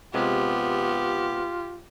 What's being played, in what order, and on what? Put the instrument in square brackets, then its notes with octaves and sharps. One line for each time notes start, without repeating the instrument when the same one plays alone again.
[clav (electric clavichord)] C3 G#3 [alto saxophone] B3 [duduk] F4 [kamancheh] G4